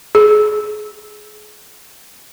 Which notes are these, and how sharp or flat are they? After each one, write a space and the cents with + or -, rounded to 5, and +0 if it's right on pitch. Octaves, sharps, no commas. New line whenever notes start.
G#4 +30